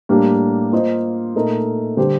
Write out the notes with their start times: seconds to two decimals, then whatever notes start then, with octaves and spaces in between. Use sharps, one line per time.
0.09 A2 G3 A#3 D4 G4
0.72 A#3 F4 C5 D#5
1.35 A#2 A3 D#4 A#4 D#5
1.97 D3 G3 D4 G4 C5